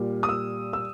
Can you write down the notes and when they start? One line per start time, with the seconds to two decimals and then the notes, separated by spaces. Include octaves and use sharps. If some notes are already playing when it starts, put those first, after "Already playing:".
Already playing: A#2 G3
0.23 D#6
0.29 E6
0.73 E6